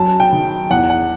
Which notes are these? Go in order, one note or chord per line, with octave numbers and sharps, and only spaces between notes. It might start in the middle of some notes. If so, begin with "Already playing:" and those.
Already playing: F#2 A5
G5
D#3
E2 F#5
F#5